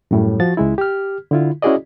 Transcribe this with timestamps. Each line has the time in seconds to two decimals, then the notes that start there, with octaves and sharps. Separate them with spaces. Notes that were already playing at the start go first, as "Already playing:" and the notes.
0.11 F#2 A2 G3
0.40 F3 F#4 A6
0.57 C#2 G#3 E4
0.78 G4 F6
1.31 D3 E4 F4
1.62 C#4 E4 F#4 G#4 D5 D#5